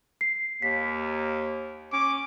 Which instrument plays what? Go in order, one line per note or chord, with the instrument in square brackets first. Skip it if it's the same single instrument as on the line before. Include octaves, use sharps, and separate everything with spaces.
[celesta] C7
[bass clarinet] D#2 [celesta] B6
[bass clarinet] C#4 [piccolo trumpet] D6